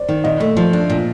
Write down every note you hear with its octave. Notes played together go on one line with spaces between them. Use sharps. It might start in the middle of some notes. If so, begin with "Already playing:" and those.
Already playing: C5 D5
D#3
A#2 D#5
A3
F3
D4
A#2